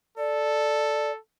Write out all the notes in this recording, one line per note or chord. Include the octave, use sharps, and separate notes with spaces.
A4 D5